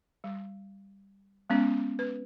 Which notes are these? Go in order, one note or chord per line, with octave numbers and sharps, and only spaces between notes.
G3
G#3 B3 C#4
B4